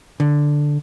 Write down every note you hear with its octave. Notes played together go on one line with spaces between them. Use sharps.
D3